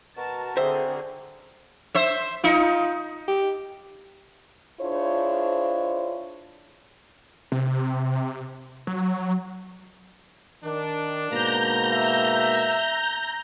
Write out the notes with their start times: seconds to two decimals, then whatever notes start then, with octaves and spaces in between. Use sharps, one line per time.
0.17 B2 F#4 A#4 A5
0.57 D3 C4 G#4 C5 E5
1.95 C5 E5
2.44 D#4 F4
3.28 G4
4.80 D4 E4 F4 G#4 C5 C#5
7.52 C3
8.87 F#3
10.64 D#3 D4
11.30 G#2 B2 A#3 A#5 G6
11.91 E5